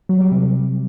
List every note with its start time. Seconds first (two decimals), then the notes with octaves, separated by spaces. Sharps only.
0.09 F#3
0.20 G3
0.31 C3